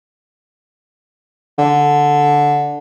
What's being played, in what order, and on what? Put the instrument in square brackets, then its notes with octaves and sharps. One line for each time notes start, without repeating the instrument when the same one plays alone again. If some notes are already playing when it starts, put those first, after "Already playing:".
[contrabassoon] D3